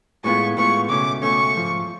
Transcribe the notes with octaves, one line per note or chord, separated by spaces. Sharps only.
A2 G#3 B3 F4 C#6
A2 G#3 B3 F4 C#6
C#2 B2 A3 C#4 D6
C#2 B2 A3 C#4 C#6
G#2 F3 A3